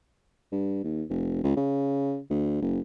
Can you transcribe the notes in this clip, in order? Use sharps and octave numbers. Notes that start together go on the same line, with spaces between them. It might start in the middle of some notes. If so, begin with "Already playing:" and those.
G2
D#2
F1
C#2
C#3
D2
F#1